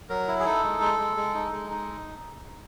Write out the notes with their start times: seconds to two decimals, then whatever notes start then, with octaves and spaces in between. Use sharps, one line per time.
0.10 F#3 A#4
0.28 E4
0.39 G#4
0.45 D#4 A4
0.63 G#3
0.81 G#3
0.99 G#3
1.17 G#3
1.34 D#4
1.52 G#3
1.71 D#4